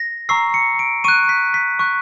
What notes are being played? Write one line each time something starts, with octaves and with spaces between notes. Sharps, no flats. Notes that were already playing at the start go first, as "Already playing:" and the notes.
Already playing: A#6
A#5 C#6 E6 C7
C#7
D7
C#6 F#6 D#7
B6
B6
C#6 F#6